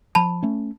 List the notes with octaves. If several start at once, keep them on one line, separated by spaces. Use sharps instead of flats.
F3 A5 B5
A3 C#4